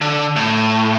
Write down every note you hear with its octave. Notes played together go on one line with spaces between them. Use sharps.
D3
A2